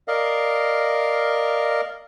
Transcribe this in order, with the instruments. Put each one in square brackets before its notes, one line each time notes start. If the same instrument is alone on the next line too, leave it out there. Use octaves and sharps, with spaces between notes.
[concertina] A#4 D5 D#5 F5